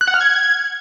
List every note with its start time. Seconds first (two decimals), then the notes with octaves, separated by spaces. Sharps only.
0.01 F#6
0.07 F#5
0.14 F6
0.21 G#6